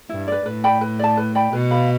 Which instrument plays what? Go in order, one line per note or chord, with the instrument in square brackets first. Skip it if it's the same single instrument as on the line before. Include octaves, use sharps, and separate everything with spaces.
[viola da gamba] G2 [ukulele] E4
[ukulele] B4 D5
[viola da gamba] A2 [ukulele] B4
[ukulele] D5 G5 B5
B4
D5 A5
B4
D5 G5 B5
[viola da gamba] B2 [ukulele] B4
[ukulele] F5 B5